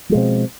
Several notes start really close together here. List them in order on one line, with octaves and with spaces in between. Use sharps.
F3 G#3 B2 C4